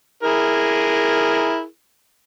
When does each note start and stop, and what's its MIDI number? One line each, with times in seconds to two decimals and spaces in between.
0.23 1.64 64
0.23 1.64 68
0.23 1.64 70